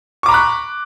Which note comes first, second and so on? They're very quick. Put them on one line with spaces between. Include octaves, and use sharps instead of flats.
C#6 D6 A#5 B5 F#6